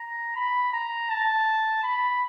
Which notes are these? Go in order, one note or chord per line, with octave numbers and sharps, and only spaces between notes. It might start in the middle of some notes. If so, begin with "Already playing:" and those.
Already playing: A#5
B5
A#5
A5
B5